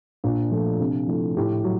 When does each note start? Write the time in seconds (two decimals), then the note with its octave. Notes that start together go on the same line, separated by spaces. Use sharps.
0.24 A#2 D4
0.51 F3 A3 D4
0.80 C3 D4
1.07 F3 A3 E4
1.37 A2 G4
1.64 F#3